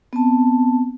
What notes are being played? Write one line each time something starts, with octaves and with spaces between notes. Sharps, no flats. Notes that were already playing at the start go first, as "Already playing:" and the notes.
B3 C4 A5